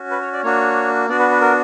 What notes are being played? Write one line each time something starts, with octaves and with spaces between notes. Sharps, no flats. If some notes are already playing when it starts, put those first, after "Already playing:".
Already playing: C#4 F#4
B4
C#5
D5
A#3 D4 F#4 C#5
B3 D4 F#4 D5
B4
B4
A#4